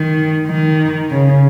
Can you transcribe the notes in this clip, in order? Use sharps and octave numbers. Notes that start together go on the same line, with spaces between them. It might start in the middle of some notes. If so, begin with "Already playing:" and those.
Already playing: D#3
D#3
C#3